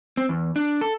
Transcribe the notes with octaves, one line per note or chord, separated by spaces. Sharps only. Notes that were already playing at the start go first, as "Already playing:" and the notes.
C4
E2
D4
A4